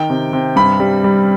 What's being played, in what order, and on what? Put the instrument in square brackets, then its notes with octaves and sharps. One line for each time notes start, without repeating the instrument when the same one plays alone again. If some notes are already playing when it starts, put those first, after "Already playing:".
Already playing: [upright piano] D#3 G5
C3
C3
G2 B5
G3
G3